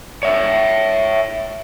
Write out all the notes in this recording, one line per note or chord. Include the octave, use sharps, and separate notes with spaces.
C#5 E5